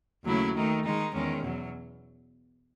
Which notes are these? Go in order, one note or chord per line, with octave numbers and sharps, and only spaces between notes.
D#2 C#3 F#3 A3 E4
D#3 A3 D#4
D#3 G#3 D#4
E2 D#3 G#3 C#4
E2 B2 F#3